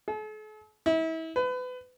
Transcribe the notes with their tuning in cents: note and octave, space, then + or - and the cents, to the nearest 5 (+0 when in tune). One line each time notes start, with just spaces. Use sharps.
A4 -45
E4 -35
B4 +30